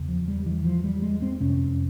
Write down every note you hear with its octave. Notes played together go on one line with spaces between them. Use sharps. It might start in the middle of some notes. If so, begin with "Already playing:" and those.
Already playing: E2 C#3
F3
G3
E3
F3
G3
G#3
C4
F2 C3 C#4